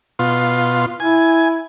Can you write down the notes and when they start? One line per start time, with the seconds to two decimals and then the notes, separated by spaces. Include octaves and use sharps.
0.19 B2 F4 C6
1.00 E4 G#5